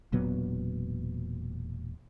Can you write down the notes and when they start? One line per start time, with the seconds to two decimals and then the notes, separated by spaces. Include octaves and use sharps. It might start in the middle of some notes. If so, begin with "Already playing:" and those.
0.12 E1 A#2 F#3 B3